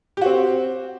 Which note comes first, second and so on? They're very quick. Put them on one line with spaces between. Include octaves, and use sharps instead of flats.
G4 F#4 C4